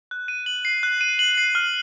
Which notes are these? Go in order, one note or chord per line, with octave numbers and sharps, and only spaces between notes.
F#6
D#7
F#7
C7
F#6
D#7
F#7
C7
F6